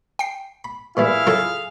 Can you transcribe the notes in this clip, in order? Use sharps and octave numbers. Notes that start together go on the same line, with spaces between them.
G5 C7
B5
A#2 E3 G3 E4 G#4 F5
C#3 F#3 F4 A4 A5